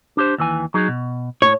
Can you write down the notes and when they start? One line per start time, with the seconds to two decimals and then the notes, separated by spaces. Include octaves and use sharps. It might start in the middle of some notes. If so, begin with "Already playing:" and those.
0.17 D4 G4 C5
0.38 D#2 E3 G#5
0.74 F#3 D#4 G#4
0.88 B2
1.42 A2 C#5